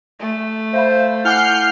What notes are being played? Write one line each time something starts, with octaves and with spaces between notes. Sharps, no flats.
A3
C5 E5 F5 B5
E4 F#5 G#5 D6 F6 G6 C7